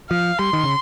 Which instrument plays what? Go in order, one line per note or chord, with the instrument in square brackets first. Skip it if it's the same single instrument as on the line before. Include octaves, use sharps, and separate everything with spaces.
[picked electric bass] F3 [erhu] F5
[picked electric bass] G3 [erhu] C6
[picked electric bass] D#3
C#3